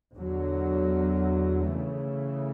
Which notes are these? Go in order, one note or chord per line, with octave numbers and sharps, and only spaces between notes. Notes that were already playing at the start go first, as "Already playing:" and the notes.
E2 D3 F#3
C#3 E3 A3